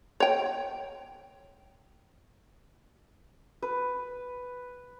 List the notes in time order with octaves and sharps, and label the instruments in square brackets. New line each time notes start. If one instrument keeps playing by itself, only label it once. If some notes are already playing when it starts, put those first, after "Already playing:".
[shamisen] C#5 G5
[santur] B4